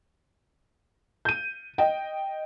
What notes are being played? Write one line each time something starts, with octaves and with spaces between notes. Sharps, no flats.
G6 D#7
D#5 G5